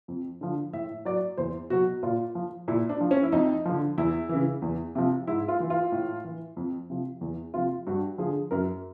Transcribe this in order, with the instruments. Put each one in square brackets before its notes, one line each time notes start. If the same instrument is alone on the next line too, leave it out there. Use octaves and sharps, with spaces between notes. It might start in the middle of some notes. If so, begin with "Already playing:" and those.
[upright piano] F2
D3 F3
A2 E5
F#3 D5
E2 C5
B2 F#3 F#4
A#2 F4
F3
A#2 E4
D4
F3
C#4
E4
F2 D#4
D3 F3
E2 E4
C#3 E3
E2
C3 F3
G#2 E4
F4
E3
F4
A2
E3
F2
C3 F3
E2
C3 F3 F4
G2 F#4
D3 F3 G#4
F#2 A#4